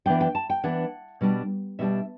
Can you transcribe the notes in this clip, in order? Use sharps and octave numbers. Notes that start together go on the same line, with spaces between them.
E3 B3 D4 G5
G5
A5
G5
E3 B3 D4 F#5
B2 G3 D4
B2 G3 D4 E5